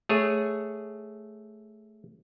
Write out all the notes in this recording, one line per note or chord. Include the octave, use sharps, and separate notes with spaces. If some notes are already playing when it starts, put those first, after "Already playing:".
A3 G#4 C#5